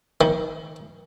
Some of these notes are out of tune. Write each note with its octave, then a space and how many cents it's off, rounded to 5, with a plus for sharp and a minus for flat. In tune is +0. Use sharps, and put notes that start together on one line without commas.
D#3 +25